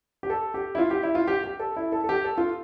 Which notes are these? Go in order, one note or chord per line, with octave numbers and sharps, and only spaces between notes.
G4
A4
G4
E4
F4
G4
E4
F4
G4
G4
A4
E4
A4
A4
G4
A4
F4